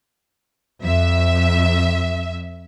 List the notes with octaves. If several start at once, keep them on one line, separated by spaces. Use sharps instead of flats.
F2 E5